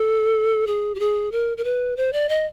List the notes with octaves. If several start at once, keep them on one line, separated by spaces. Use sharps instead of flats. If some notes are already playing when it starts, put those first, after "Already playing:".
Already playing: A4
G#4
G4
G#4
A#4
A#4
B4
C5
D5
D#5